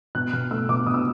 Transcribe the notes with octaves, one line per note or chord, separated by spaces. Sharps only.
B2 F#6
B2 F6
A3 E6
B2 D6
B2 D#6
E6